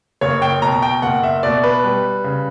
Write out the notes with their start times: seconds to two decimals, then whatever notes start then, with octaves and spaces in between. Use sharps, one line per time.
0.21 F#1 C#5
0.42 G5
0.62 B2 A#5
0.82 G5
1.02 F#1 F#5
1.23 E5
1.43 B2 D5
1.64 B4
1.84 G3
2.24 C#3